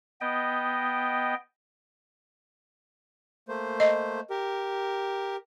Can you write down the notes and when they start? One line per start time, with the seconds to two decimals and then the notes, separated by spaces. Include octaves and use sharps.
0.21 B3 D#5 G5
3.48 A3 A#3 C5
3.80 D#5
4.30 G4 A#4